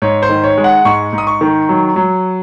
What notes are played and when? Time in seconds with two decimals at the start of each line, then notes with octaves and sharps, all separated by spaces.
0.02 G#2 C#5
0.22 C5
0.29 D#3
0.44 C#5
0.57 G#3
0.64 F#5
0.85 G#2 C#6
1.13 G#2
1.18 D#6
1.27 C#6
1.41 D#3
1.69 F#3
1.96 F#3